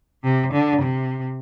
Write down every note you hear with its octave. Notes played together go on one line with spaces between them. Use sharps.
C3
D3
C3